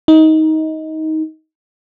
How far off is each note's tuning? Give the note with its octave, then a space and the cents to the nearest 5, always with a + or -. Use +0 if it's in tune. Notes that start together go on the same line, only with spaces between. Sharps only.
D#4 +20